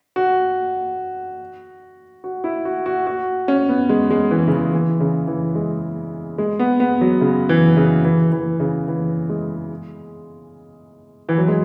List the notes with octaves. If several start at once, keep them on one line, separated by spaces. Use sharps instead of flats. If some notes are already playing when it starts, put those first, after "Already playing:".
F#4
F#4
E4
F#4
F#4
F#4
C#4
B3
G#3
G#3
E3
C#3
E3
E3
C#3
E3
G#3
G#3
B3
B3
F#3
C#3
E3
C#3
E3
E3
C#3
E3
G#3
E3
F#3
G#3